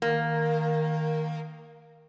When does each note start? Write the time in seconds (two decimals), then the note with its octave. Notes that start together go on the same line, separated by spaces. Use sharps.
0.02 D#3 A#3